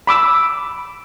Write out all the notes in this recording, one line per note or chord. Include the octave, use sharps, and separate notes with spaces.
B5 D6 E6